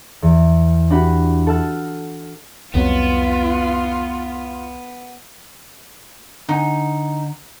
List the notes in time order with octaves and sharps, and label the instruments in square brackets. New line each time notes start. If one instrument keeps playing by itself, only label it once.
[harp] E2
D4 F#4 G4 F#5 B5
A4 F#5 A5 E6 F6 A6
[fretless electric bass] C2 F2 F#3 [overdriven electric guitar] B3 [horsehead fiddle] F4
[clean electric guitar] D3 F#5 G#5 [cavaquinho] D#4